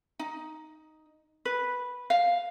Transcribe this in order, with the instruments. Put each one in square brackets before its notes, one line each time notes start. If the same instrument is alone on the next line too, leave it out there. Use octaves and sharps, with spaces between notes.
[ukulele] D#4
B4
F5